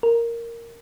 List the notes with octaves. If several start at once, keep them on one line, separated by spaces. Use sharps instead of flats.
A#4